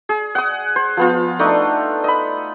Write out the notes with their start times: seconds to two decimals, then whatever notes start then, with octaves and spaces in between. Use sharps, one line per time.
0.09 G#4
0.35 F#5 D#6
0.76 C5
0.97 F3 B3 F4
1.39 A3 D4 D#4
2.04 D#5 B5